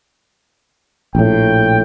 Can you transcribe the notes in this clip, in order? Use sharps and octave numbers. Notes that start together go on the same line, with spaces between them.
A#1 A2 G5